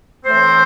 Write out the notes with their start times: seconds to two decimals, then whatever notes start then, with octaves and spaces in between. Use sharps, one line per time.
0.24 A2 E3 A3 C4 C5